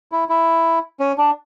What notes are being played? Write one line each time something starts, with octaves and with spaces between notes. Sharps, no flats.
E4
E4
C#4
D4